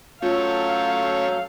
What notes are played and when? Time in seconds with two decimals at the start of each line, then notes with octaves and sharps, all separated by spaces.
0.22 F#3 A3 C#4 F4 A4 F5 G6